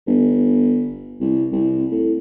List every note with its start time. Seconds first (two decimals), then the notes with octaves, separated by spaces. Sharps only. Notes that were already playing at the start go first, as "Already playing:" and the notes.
0.07 G1
1.20 C2
1.52 C2
1.91 A2